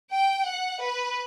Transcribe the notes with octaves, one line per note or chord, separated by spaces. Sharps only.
G5
F#5
B4